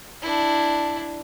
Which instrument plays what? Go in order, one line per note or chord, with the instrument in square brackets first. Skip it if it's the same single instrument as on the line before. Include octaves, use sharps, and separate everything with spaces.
[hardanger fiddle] D4 E4